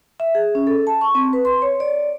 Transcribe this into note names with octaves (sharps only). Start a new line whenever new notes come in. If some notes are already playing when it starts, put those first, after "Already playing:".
E5
G#4
C#4
A4
A5
C#6
C4
B4
C6
C#5
D5